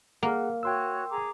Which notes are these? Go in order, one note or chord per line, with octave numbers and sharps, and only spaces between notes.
A#3 G#4 F#5
F#4 C#5 G5 C6 E6 F#6
G#4 A#5 D6